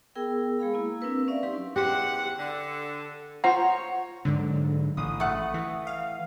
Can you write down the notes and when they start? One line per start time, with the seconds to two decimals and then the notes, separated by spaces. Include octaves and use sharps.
0.15 B3 G#4 A#4 G5 E6
0.59 G#3 G#4 F5 B5
0.73 A#3 E4
1.01 C4 D4 A#4 B4 E6
1.28 C#4 D5 E5 F5
1.43 F#3 D#4 G4 C6
1.76 E2 G4 C5 F#5
2.39 D3
3.44 F4 C5 C#5 F#5 A#5
4.25 G#2 D3 F#3
4.97 A1 D#6
5.20 A3 F#5
5.54 E3
5.87 F5